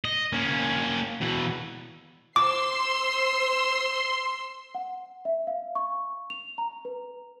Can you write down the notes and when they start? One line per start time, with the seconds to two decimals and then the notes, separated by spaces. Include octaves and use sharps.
0.05 D#5
0.33 A#3 C#4
1.21 B2 E3
2.36 C5 C6 D6 E6 C7
4.75 F#5
5.25 E5
5.47 F5
5.75 C#6
6.30 F7
6.58 A#5
6.85 B4